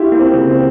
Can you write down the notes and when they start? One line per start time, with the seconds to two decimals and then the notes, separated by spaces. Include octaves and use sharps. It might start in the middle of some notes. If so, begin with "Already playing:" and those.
Already playing: E4 F4 G4
0.12 A#3
0.19 C4
0.34 C#3
0.49 C4